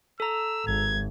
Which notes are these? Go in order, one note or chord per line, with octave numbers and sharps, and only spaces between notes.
A4 A#5 E6
G#1 G#6